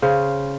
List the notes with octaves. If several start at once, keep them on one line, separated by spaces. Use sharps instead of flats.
C#3 C5